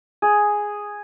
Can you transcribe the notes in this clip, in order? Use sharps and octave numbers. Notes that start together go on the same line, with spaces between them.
G#4